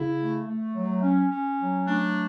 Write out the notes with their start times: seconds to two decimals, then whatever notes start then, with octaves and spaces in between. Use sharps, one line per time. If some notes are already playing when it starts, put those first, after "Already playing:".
Already playing: C#3 E4
0.19 A3
0.47 A3
0.74 F#3
1.02 C#4
1.31 C#4
1.59 F#3
1.87 A3 D4